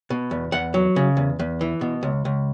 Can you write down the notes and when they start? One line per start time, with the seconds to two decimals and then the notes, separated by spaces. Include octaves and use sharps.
0.10 B2
0.31 E2
0.52 E2 F#5
0.74 F#3
0.96 C#3
1.17 E2
1.39 E2
1.61 E3
1.81 B2
2.03 C#2
2.25 C#2